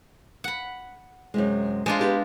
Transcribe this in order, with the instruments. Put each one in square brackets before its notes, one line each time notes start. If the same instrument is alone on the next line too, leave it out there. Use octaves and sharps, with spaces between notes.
[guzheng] F#5 B5
[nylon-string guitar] F#2 C3 G#3
[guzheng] G#3 D4 F4 [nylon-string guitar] C5
[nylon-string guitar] B3 G4 B4